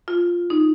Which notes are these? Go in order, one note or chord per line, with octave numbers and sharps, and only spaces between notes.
F4
D#4